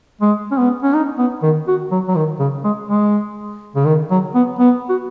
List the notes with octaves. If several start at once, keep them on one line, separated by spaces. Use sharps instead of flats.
G#3
C#4
B3
C#4
D#4
B3
D#3
F#4
F#3
F#3
D#3
C#3
G#3
G#3
C#3
D#3
F#3
B3
B3
F#4